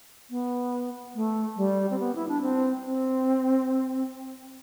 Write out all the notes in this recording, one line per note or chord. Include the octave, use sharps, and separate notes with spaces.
B3
A3
G3
C4
B3
E4
D4
C4
C4